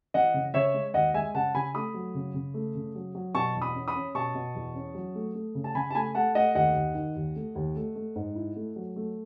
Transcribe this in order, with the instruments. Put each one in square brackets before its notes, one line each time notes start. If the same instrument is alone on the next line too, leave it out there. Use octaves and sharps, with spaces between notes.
[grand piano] E3 D#5 F#5
C#3
C#3 C#5 E5
G#3
D#2 D#5 F#5
G#3 E5 G#5
C#3 F#5 A5
C#3 G#5 B5
A3 B5 D#6
F#3
C#3
C#3
A3
C#3
F#3
F#3
B2 A5 C#6
E2
B5 D#6
C#4
B5 D#6
C#4
B2 A5 C#6
B2
E2
C#4
F#3
A3
A3
C#3
A5
C#3 G#5 B5
A5
A3 G#5 B5
A3 F#5 A5
A3 D#5 F#5
D#2 D#5 F#5
D#2
D#3
D#2
A3
D#2
A3
A3
G#2
E4
A3
F#3
A3